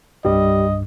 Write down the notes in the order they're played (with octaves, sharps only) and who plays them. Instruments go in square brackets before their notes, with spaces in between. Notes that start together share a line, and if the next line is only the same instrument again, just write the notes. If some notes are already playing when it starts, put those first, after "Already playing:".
[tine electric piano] C2 G2 [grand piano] G3 [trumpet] D#5